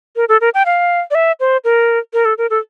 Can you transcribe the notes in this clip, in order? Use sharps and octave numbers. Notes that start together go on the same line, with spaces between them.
A#4
A4
A#4
G5
F5
D5
E5
C5
A#4
A#4
A4
A#4
A4